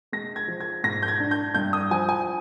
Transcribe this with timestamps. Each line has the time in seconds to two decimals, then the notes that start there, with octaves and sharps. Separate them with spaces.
0.12 G#3 A#6
0.36 G#6
0.48 F3
0.60 G#6
0.84 G#2 A#6
1.03 G6
1.08 G#6
1.20 D4
1.31 G6
1.54 G2 G6
1.73 D#6
1.91 F3 G#5
2.09 G#5